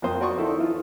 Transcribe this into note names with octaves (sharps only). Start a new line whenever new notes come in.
F2 A#3 C4 C5 D#6
F#4 D5 C6 C#6 D#6
D#4 E4 A4 C5
E3 F4